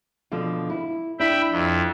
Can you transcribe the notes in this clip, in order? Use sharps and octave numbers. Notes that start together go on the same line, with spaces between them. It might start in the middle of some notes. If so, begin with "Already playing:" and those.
B2 D3 F3
E4
D4 E4 E5 G5 B5
F2